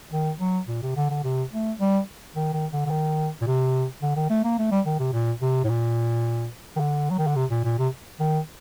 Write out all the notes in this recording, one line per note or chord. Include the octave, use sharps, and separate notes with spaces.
D#3
F#3
A#2
C3
D3
D3
C3
A3
G3
D#3
D#3
D3
D3
D#3
A#2
C3
D3
D#3
A3
A#3
A3
G3
D#3
C3
A#2
C3
A2
A#2
D#3
D3
F#3
D#3
D3
C3
A#2
A#2
C3
D#3